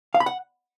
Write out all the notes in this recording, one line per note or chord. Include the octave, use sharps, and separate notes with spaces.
F5
B5
F#5